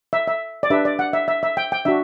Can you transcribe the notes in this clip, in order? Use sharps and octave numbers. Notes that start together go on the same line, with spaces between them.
E5
E5
D5
D4 G4 B4 E5
D5
F#5
E5
E5
E5
G5
G5
D4 F#4 E5